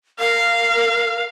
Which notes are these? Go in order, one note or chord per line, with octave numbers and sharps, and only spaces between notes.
A#4 F5